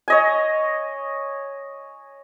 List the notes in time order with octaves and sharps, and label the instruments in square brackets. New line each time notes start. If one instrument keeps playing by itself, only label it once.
[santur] C#5 D#5 G#5